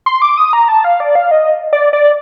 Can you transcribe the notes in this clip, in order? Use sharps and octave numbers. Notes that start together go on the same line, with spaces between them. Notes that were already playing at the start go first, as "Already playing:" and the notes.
C6
D6
D#6
A#5
A5
F5
D5
F5
D#5
D5
D5